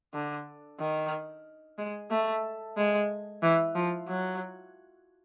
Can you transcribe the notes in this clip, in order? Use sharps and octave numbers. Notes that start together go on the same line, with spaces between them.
D3
D#3
G#3
A3
G#3
E3
F3
F#3